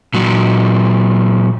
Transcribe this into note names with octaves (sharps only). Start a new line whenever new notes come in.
A#2 F#3